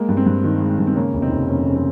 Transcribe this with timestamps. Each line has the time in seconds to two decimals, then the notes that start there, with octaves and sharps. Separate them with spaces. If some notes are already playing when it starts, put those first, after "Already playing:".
Already playing: G#3 A#3
0.08 G2
0.17 C4
0.26 G2
0.44 D#3
0.61 G#3
0.78 G2
0.87 C4
0.96 C#3 A#3 C#4
1.13 F1
1.22 C4 D#4
1.31 F1
1.48 F2 A#3 C#4
1.66 C#3
1.75 C4